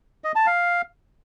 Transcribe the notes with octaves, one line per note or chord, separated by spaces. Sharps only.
D#5
A5
F5